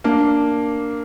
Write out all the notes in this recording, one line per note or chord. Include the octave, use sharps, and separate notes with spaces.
A#3 D4